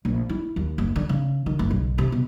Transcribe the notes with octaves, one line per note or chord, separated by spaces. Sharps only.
A#1
E4
D#2
F#1
D3
C#3
D#3
F#1
B1
C3
B2